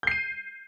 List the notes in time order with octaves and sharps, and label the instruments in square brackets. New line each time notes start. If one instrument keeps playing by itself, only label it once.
[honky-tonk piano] G6
C7
D#7